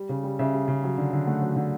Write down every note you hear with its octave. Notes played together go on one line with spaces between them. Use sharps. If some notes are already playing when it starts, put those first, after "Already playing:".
Already playing: G3
C#3
G3
C#3 E5
G3
C#3
F#3
D3
D3
A3 F#5
F#3
D3